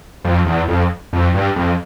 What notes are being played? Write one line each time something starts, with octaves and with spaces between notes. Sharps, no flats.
F2
E2
F2
F2
G2
F2